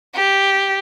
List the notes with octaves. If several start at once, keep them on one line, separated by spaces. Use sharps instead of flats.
G4